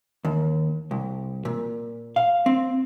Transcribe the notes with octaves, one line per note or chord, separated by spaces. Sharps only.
D#2
C2
A#2
F5
C4